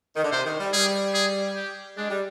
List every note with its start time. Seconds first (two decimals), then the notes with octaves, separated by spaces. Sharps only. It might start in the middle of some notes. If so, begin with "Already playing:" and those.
0.16 D#3
0.24 D3
0.32 C3 C5
0.45 D#3
0.60 G3
0.73 G3 G#4
1.14 G#4
1.56 G4
1.97 G#3 D4
2.10 G3